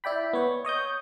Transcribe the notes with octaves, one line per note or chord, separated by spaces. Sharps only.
E4 D5 G5 B5
B3 C#5
C#5 D#5 D#6 G6